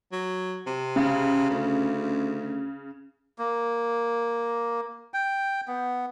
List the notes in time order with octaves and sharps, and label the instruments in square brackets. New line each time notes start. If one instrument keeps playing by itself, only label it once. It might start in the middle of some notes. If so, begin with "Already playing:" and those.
[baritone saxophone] F#3
C3
[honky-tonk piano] C#3
[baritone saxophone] D2
[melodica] A#3
G5
B3